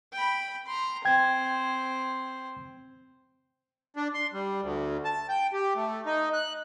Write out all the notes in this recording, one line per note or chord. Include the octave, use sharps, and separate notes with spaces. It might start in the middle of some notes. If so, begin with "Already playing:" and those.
G5 B5
A#5 C6
C4 C5 G5 G#6
D4
C6
G3
D2
A5
G5
G4
A3
D#4
F#6